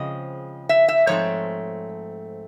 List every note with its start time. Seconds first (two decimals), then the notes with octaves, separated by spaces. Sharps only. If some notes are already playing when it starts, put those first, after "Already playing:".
Already playing: C#3 F3 G#3 C4 D#5
0.69 E5
0.88 E5
1.07 G#2 F3 A3 C4 C#5